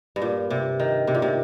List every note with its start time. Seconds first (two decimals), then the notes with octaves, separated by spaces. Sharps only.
0.16 G2
0.22 A#2
0.50 C3
0.80 D#3
1.07 C3
1.15 A#2
1.22 C3